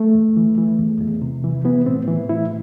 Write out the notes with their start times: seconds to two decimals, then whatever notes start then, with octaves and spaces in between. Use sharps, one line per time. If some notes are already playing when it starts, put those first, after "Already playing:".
Already playing: A3
0.15 E2
0.37 E3
0.58 E3
0.79 E2
1.01 E2
1.22 C3
1.44 E3
1.64 E3 B3
1.86 A2 C4
2.08 E3
2.29 A2 E4